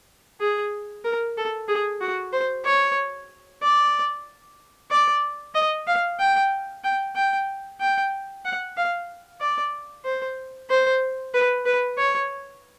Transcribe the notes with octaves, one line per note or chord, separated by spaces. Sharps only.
G#4
A#4
A4
G#4
F#4
C5
C#5
D5
D5
D#5
F5
G5
G5
G5
G5
F#5
F5
D5
C5
C5
B4
B4
C#5